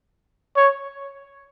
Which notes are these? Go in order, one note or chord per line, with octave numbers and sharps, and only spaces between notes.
C#5